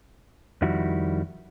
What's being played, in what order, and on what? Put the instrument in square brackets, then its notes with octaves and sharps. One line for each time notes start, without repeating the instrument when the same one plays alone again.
[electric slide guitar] F2 D#3 G3 E4 F#4